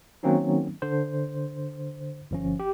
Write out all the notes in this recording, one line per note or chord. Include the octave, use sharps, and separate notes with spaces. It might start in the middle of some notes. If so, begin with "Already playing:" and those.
D#3 F#3 A#3 C4 C#4 D#4
D3 C5
G1 F3 C#4
G4